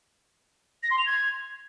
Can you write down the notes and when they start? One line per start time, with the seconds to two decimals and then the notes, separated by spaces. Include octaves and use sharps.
0.83 A#6
0.91 C6
0.98 F7
1.06 G#6